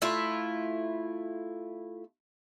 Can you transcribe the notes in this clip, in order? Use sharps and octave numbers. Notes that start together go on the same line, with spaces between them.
A3 E4 F4